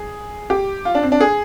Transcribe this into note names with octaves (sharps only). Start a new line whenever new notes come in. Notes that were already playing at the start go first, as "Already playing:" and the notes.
Already playing: G#4
G4
F4
D4
C4
D4
G#4